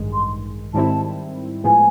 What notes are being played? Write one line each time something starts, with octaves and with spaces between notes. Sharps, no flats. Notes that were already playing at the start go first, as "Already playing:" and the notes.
Already playing: A1 G2 D#3 G#3
C6
G#2 D#3 G3 C4 E4 A5
A2 F3 G#3 B3 G#5